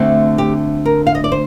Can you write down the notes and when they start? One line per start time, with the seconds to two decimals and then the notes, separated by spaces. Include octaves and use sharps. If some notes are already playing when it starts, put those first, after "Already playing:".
Already playing: D2 D3 A3 C4
0.38 G4
0.86 A#4
1.07 F5
1.15 D#5
1.24 D5
1.32 C5